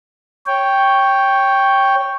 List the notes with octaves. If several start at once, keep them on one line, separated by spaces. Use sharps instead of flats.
C#5 G5